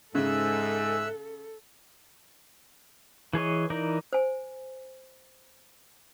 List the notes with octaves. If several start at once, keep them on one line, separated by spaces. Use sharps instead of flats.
G#2 C#3 A4 E5 E6 F#6
E3 G#4 C#5 D#5
E3 D#4 A#4 D5
C5 G#5